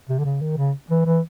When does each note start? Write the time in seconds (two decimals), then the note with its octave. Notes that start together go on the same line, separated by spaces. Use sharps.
0.09 C3
0.19 D3
0.25 C#3
0.42 D#3
0.58 C#3
0.90 E3
1.06 E3